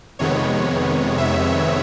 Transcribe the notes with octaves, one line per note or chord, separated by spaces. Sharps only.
F2 C3 D#3 G#3 B3 C#5
E5